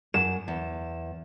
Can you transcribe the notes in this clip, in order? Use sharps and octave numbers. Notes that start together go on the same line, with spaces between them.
F#2 E7
E2